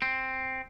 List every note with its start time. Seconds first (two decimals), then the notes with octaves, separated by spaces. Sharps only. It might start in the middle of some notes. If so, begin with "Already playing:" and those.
0.02 C4